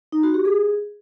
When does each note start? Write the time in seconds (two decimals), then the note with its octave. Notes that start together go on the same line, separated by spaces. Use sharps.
0.12 D#4
0.23 F#4
0.34 G4
0.45 G#4